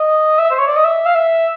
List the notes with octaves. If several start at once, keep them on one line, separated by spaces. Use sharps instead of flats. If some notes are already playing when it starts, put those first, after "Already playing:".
Already playing: D#5
E5
C5
C#5
D5
D#5
E5
F5
E5